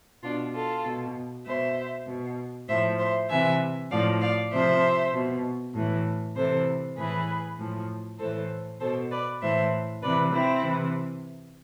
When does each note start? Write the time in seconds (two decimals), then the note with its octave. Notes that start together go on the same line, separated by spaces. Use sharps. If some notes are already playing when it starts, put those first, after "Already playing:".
0.23 B2 D4 F4
0.54 F4 A4
0.85 B2
1.46 B2 C5 E5
2.07 B2
2.68 A2 F3 C5 E5
2.99 C5 E5
3.29 C3 E3 E5 G#5
3.91 A2 F3 D5 F5
4.21 D5 F5
4.52 C3 F3 C5 E5
5.13 B2
5.74 A2 E3
6.36 C3 E3 A4 C5
6.97 A2 E3 G#4 B4
7.58 A2 F3
8.19 A2 E3 A4 C5
8.80 B2 A4 C5
9.11 B4 D5
9.41 A2 E3 C5 E5
10.03 C3 E3 B4 D5
10.33 C4 E4
10.64 C3 E3